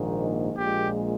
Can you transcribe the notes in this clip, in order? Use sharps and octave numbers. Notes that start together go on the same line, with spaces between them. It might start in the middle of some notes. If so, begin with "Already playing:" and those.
Already playing: A#1 G#2 D#3 A#3 D#4
A#1 A#2 G#3 G4